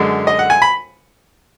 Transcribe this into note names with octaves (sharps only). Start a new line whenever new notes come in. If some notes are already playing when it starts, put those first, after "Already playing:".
Already playing: F#2 D3 G#3
D#5
F#5
G#5
B5